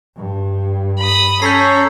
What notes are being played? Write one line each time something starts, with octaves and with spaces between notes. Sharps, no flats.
G2
B5 D#6
C#4 A4 C#5 A#5 G6 B6 C7